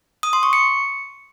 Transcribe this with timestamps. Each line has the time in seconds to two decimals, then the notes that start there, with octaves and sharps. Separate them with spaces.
0.23 D#6
0.33 C6
0.43 C#6
0.53 C#7